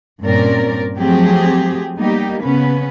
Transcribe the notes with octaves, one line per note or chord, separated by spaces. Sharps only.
G2 A#2 C4 C#4 A#4 D5
F3 F#3 A3 C4 G4 G#4
G3 A#3 B3 D#4 G4
C#3 B3 C#4 B4